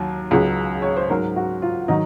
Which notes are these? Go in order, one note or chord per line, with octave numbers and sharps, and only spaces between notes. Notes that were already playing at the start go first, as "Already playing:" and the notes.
Already playing: D#2 F#3
C#2 C#3 F#3
C#5
C5
G#2 F#3 A#4
F#4
F4
D#3 F#3 D#4